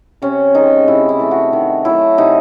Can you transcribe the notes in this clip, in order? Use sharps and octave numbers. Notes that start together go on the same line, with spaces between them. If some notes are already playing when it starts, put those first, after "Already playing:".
C3 C#4
D#3 G#3 D#4
C3 E4
E4
E3 A3
F#4
D#3
F#3 A3 E4
C3 D#4